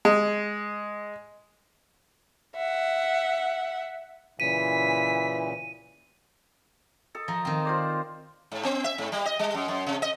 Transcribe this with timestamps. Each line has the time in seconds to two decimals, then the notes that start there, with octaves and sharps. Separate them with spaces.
0.05 G#3
2.56 E5 F#5
4.40 A#2 C#3 E3 B6 D#7
7.15 A4 D#5
7.28 F3 A#5
7.45 D#3 C4
7.65 F4 C5 D5
8.52 G#2
8.64 B3
8.84 E5
8.98 G#2
9.12 G3
9.25 D#5
9.39 G3
9.54 F#2
9.68 F#2
9.86 C3
10.02 D#5